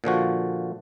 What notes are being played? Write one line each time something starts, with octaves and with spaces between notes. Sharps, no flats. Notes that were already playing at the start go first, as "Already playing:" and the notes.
A#2 D3 F3 F#4